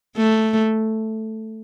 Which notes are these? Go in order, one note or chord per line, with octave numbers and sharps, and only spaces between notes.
A3